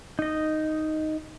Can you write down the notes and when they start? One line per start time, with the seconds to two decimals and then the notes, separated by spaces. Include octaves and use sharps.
0.19 D#4 D#5